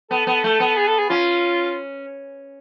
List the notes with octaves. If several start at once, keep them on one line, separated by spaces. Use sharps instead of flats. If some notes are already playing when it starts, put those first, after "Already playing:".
B3 A4
B3
A3
B3
G#4
A4
G#4
C#4 F4